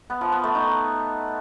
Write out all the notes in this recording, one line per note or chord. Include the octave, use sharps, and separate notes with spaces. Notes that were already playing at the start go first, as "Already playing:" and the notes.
B3
F3
B3
A3
D#4